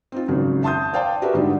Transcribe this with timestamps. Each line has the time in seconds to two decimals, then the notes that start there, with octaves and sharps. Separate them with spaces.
0.12 C4 D#4 F4
0.28 G#1 C#3 F#3
0.63 E5 A5 C6 D#6 G6
0.93 C5 D5 F5 G5 A5
1.22 F#4 G4 A#4 B4 E5
1.34 G#2 D3 G3 D4 D#4 F4